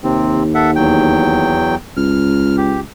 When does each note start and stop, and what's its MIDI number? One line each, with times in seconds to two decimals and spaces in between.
0.04 1.61 39
0.04 0.43 48
0.04 0.43 60
0.55 0.71 69
0.55 0.71 76
0.55 0.71 78
0.76 1.75 40
0.76 1.75 54
0.76 1.75 79
1.97 2.82 37
1.97 2.56 89
2.57 2.80 67